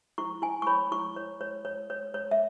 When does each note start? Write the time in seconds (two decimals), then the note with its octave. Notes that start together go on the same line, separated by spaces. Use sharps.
0.18 E4 C#6
0.42 E4 G#5
0.62 C#6
0.67 C#5 B5
0.91 E4 C#6
1.16 C#5
1.41 C#5
1.65 C#5
1.90 C#5
2.14 C#5
2.31 E5